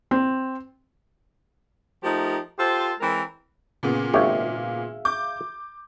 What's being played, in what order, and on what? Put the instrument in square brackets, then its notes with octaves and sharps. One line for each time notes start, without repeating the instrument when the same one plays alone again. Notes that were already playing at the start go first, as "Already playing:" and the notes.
[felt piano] C4
[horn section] F3 A3 D#4 G4 A#4
F4 G4 A4 C5
E3 G#3 C4 A#4
[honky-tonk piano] A#2 C#3 B3
[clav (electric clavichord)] G#1 G4 C#5 [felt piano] G#4 E5 F5
[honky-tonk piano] D6 G6